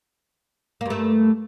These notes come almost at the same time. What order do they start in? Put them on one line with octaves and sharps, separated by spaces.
A#3 G2 A3